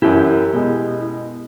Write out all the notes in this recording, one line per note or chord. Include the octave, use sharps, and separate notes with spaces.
F#2 E3 E4 G4
B2 G#3